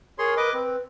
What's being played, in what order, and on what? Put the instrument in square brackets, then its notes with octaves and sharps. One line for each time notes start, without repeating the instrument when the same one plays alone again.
[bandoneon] G#4 C#5 C6 [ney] A#4
[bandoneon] B4 D#5 D6
[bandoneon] C4 [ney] B4